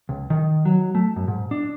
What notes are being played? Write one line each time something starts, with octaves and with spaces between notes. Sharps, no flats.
C#2
D#3
F#3
A3
F#2
G#2
D4